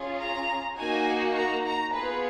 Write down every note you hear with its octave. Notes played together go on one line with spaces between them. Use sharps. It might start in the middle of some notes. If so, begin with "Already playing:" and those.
Already playing: C#4 F4 G#4
A#5
A#3 D#4 F#4 G#5
A#5
A#5
B3 F4 G#4 B4